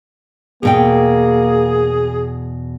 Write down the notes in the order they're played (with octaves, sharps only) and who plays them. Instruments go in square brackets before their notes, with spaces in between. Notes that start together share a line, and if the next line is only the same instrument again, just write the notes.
[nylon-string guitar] E2 B2 G5 [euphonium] A#3 [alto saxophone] G#4